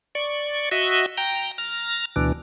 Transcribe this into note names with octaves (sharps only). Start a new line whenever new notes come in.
D5 C#6
F#4 D#5 E5
G5 A#5
A#5 F6
D2 B2 E3 D4